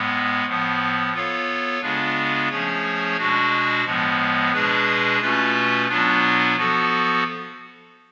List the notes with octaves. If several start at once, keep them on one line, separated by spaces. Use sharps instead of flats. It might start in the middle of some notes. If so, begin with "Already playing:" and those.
Already playing: A2 G#3 B3
A2 F3 B3
B3 F4 A4 C#5 F5
C#3 G#3 B3 D4 F4
F3 A3 C#4 G#4 C#5
B2 G#3 D4 F#4
A2 F3 G#3 B3
B2 G#3 D4 G#4 B4
B2 A3 C#4 F4 B4
B2 F#3 B3 D4 F4
F3 B3 F#4 A4